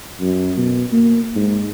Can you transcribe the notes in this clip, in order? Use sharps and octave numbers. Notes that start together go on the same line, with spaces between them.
F#2
B2
A#3
G#2